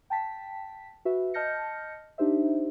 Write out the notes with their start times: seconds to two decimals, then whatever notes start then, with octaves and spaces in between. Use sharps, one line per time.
0.10 G5 A5 B6
1.05 F#4 B4 E5
1.34 D#5 A5 F6 G6 A#6 C#7
2.18 D4 D#4 G4 C5 E5